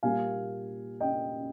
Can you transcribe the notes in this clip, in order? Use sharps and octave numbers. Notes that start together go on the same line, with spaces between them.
A#2 G3 A#3 F5 G#5
D#5 G5